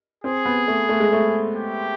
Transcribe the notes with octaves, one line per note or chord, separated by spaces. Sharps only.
C4 G#4
B3
A3
A3
G#3
A3
G4